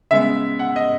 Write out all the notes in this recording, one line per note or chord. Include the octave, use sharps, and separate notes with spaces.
C#3 G#3 B3 E5
F#5
D#5